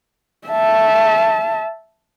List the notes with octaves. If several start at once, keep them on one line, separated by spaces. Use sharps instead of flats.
E5 A5